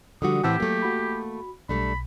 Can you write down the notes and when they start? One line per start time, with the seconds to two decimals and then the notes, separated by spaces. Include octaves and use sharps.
0.22 D3 F3 G3 F#4 D#6
0.44 A2 E3 C4 G4 F#5 A5 E6
0.60 F#3 A3 A#3
0.82 F#4 B5
1.69 B1 G3 A3 D4 B5